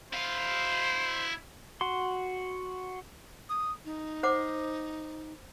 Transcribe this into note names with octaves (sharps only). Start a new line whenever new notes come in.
E4 C5 F5
F#4 C6
D#6
D#4
C5 F#5 D6